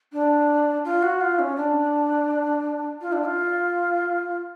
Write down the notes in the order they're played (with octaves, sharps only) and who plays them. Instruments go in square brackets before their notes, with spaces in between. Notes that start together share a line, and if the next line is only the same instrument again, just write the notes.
[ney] D4
F4
F#4
F4
C#4
D4
F4
D4
F4